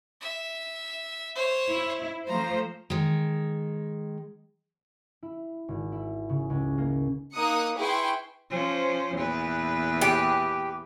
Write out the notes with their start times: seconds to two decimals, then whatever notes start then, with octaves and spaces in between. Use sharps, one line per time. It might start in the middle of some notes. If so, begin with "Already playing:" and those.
0.21 E5
1.36 C5 C#5
1.69 E4
2.27 F3 A3 C5 A#5
2.90 D#3 G#3
5.23 E4
5.68 G#1
5.92 E4
6.29 C#3
6.50 C#2
6.78 A#3
7.33 A#3 D#4 D#6 F#6 C#7
7.76 E4 G#4 B4 G5 C6 C#6
8.51 F3 C#4 C5
9.15 E2 A#2 B4
10.01 G4